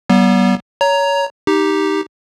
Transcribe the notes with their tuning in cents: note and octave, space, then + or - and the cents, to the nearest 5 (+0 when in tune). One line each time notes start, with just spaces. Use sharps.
G3 -45 B3 -30
C#5 +20 A#5 +0
D#4 +5 G4 +0